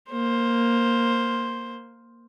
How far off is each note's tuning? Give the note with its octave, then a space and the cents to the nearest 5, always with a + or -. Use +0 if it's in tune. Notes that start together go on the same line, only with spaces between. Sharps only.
A#3 +0 C5 +5